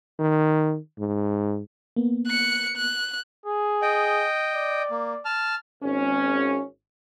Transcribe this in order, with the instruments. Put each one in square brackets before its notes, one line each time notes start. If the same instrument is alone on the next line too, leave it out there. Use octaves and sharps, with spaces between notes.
[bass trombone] D#3
G#2
[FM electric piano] A#3 B3
[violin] F#6 C#7
F#6
[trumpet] G#4
[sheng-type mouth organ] D#5 G5
[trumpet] D5
[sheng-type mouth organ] A#3
A5 F6
[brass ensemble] G#1 C#4